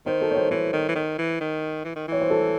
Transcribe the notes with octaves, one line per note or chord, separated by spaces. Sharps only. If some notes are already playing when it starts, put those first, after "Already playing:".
D#3 C5
A4
C#5
C5
E3 C5
D#3
E3
D#3
E3
D#3
E3
D#3
E3 C#5
C5
A4